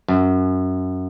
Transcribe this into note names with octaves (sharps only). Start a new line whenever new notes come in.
F#2